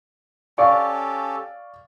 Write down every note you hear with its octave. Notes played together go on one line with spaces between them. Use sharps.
C#4 G4 A4 D5 F5 C#6